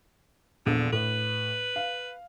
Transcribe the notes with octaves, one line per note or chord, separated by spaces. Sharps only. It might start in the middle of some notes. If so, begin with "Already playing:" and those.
A#1 E2 A#2 D3
A2 B4
F5